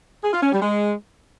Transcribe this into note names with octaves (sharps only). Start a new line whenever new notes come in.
G#4
F4
C#4
G3
G#3